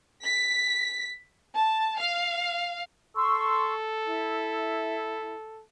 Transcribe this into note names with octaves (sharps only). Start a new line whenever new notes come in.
B6
A5
F5
A4 C6 C#6 E6
E4